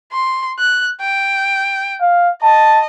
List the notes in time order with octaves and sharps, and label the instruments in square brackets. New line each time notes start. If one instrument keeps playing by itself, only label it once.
[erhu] C6
F#6
G5
[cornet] F5
[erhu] D#5 [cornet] A5